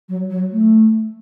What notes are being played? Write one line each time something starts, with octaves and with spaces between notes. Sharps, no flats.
F#3
F#3
A3